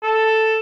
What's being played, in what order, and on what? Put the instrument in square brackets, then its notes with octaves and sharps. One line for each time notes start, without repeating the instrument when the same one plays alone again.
[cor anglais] A4